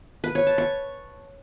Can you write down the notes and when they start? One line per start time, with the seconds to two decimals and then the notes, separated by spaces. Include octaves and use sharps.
0.24 B4
0.35 C#5
0.47 A5
0.58 C#6